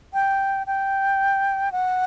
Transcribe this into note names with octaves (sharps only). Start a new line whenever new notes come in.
G5
G5
F#5